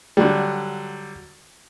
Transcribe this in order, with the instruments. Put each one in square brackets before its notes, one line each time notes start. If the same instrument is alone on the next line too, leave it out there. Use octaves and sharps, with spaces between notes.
[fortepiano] D3 F#3 G3